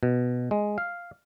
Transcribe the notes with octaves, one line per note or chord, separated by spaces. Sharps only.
B2
G#3
F5